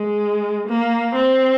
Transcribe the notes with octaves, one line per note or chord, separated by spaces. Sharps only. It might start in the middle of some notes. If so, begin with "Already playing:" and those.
Already playing: G#3
A#3
C4